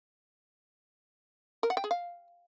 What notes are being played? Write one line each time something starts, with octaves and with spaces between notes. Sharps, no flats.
A#4
F#5
G5
G#4
F5